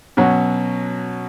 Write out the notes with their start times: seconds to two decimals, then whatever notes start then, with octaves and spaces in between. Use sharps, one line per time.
0.17 B2 F#3 C#4 F#4